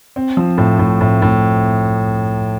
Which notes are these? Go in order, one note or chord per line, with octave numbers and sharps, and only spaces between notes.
C4
F3
A2
A2
A2
A2